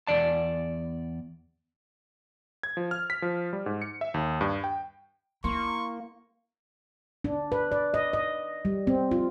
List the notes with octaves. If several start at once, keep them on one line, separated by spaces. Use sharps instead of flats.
E2 D5 A5
G#6
F3
F6
B6
F3
G3
G#2
C#7
E5
D#2
G2
G5
A#3 E4 C6 C#6
D4
B4
D5
D#5
D#5
G3
C4
F4